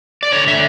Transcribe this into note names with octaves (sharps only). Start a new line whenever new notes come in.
D5
D3 C#5
D3 E5